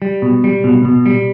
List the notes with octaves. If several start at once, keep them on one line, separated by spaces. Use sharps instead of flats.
G3
B2
G3
B2
B2
G3